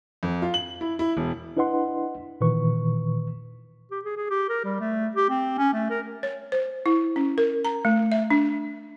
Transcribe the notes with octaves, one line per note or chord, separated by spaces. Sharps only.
F2
F4
F#7
E4
E4
E1
D4 E4 B4 D#5 F#5 C6
A#2 D#3 E3 B4 C#6
G4
G#4
G#4
G4
A#4
G3
A3
G4
C4
C#4
A3
A#4
C#5
C5
E4
C#4
A#4
A#5
A3
E5
D4